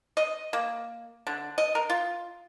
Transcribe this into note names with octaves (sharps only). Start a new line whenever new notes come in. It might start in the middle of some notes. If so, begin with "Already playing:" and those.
D#5
A#3
D3
D#5
A#4
F4